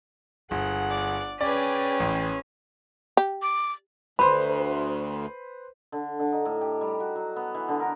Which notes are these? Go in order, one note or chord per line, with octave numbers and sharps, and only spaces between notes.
G1 G#4 F#5
D5
C#4 G#4 B4 D5 G5
A1
G4
D6
D2 B4 C5 B5 C6
D3
D3
D#4
A2
G4
G3
F#4
F#3
B3
E3
D3
A#4